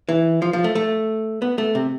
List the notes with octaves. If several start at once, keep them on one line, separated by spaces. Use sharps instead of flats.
E3
F3
F3
A3
A3
B3
A3
C3